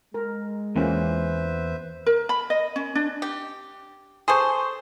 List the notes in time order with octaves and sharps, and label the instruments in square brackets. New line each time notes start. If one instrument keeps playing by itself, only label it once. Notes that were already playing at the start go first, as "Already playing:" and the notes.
[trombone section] G#3 [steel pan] A#4
[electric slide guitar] E2 [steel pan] A#3 C#4 F4 [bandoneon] B4 C5 E5
[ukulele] A#4
B5
D#5
C#4
D4
[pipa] G4
[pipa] G#4 A4 C5 [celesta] C6 C#6